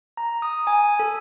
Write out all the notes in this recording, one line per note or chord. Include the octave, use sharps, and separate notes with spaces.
A#5
D#6
G#5
A4